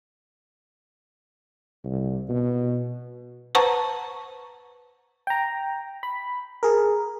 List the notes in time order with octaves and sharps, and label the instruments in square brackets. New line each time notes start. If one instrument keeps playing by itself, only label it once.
[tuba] C2
B2
[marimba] B4 C5 F#5 A5 A#5 C#6
[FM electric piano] G5 A#5
B5
G#4 A#4